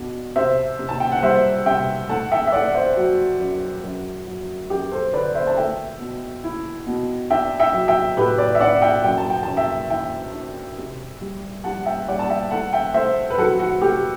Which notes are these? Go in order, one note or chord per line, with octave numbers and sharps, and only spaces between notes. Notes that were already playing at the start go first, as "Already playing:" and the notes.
Already playing: B2 D4
C3 C5 E5
C3
A5
G5
F#5
G3 C5 E5
C3 E5 G5
A3 F#5 A5
E5 G5
E5
A3 D5 F#5
C5 E5
F#3 F#4
F#2
F#2
F#3
F#2 G4
A4 C5
D3 B4 D5
C5 E5
A5
A3 E5 G5
B2
E4
B2
D4 E5 G5
E5 G5
F#3
E5 G5
A2 G4 B4
B4 D5
E5
D4 D5 F#5
E5 G5
F#2 G5
A5
G5
F#2 A5
E5 G5
E3 E5 G5
D4
C3
G3
G3 F#5 A5
E5 G5
G3 D5 F#5
A5
E5 G5
A3 F#5 A5
E5 G5
A3 C5 E5
B4
F#3 F#4 A4
F#4
A3 G4